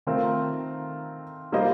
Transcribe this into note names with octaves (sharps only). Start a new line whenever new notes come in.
D#3 A3 C4 F4 A#4
G3 A#3 F4 C5 D#5